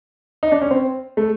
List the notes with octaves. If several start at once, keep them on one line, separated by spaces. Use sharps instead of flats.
D#4
D4
C#4
C4
A3